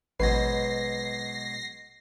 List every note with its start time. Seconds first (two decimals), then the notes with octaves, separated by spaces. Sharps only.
0.20 A1 G#2 B2 F#3 B4 A#6 C7